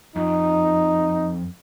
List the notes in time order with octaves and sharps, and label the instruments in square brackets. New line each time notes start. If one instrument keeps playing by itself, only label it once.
[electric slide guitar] F2 [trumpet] D#4